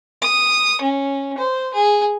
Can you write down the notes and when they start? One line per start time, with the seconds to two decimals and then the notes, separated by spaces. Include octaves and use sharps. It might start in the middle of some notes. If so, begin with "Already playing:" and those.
0.22 D#6
0.81 C#4
1.38 C5
1.74 G#4